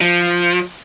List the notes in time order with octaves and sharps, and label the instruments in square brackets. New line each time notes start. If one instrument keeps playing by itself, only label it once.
[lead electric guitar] F3